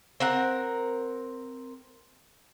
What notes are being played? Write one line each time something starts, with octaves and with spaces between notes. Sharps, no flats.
C4 A#4 F#5